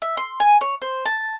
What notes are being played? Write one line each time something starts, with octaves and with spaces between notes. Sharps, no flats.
E5
C6
G#5
C#5
C5
A5